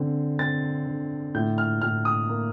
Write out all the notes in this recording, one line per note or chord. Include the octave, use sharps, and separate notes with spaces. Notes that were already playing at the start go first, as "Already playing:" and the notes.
Already playing: D3 C4
C4 A6
D3
A2 G6
F6
A2 F6
D#6
A#3